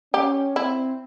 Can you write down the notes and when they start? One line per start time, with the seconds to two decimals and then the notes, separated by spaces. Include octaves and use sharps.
0.14 C#4 G4
0.56 C4 E4